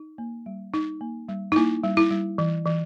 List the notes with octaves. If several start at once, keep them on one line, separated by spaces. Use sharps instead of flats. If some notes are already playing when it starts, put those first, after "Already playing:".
Already playing: D#4
A#3
G3
D#4
A#3
G3
D#4
A#3 E4
G3
E4
G3
E3
E3